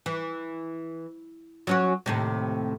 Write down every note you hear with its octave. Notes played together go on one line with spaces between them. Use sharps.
E3
F#3 C#4 F#4
D#2 A2 C3